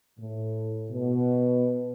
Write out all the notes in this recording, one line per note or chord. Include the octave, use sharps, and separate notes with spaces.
A2
B2